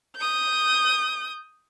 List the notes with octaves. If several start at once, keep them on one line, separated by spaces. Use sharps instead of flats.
D#6 G6